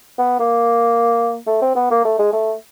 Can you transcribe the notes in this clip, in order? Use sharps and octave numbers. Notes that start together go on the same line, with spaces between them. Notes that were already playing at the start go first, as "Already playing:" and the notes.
B3
A#3
A3
C4
B3
A#3
A3
G#3
A3